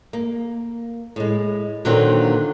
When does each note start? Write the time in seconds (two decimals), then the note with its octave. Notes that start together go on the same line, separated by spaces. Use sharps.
0.13 A#3
1.16 A2 G#3
1.85 A#2 D3 D#3 F#3 A#3 C4